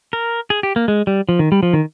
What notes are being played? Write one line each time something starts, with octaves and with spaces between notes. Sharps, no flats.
A#4
G#4
G4
A#3
G#3
G3
F3
D#3
G3
F3
D#3